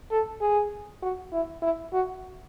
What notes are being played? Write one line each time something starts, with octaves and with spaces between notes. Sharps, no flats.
A4
G#4
F#4
E4
E4
F#4